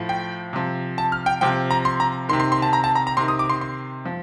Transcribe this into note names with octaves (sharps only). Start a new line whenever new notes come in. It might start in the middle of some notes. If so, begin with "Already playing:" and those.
Already playing: A2 F3
G5
C3 F3
A5
F6
G5
C3 F3 G5
A#5
C6
A#5
C3 D#3 C6
C6
C6
A5
A#5
A5
A#5
A#5
C3 D#3 C6
D#6
D6
C6
C6
F3